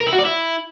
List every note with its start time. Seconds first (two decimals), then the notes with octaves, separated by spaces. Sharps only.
0.01 A#4
0.07 E4
0.13 F#4
0.19 D5
0.25 E4